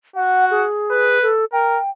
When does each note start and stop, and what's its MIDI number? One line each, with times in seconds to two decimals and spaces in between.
0.16 0.67 66
0.16 0.45 78
0.51 1.21 68
0.91 1.32 71
1.22 1.45 69
1.52 1.79 70
1.52 1.90 79